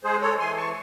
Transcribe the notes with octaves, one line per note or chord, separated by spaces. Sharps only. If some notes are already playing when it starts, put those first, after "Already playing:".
G#3 G#4 C5
A4 C#5
E3 G#5 C6
A5 C#6